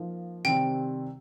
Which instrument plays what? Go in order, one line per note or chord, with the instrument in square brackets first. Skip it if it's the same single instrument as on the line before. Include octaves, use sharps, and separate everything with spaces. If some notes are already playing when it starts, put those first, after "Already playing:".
Already playing: [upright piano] F3 A#3 D#4
[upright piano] C3 D#3 G3 C4 [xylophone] G5